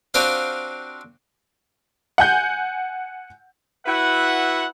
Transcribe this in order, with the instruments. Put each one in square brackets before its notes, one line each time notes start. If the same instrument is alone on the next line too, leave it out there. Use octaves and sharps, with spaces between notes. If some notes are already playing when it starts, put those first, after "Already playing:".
[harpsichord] C4 D4 F4 F#4 C5 F5
[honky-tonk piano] F#5 G#5 G6
[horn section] E4 F#4 B4 E5 F#5